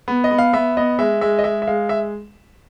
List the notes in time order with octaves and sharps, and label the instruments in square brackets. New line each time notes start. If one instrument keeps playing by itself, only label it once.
[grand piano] B3
D#5
B3
F5
B3 E5
B3 D#5
G#3 E5
G#3 E5
D#5
G#3 E5
E5
G#3 F5
E5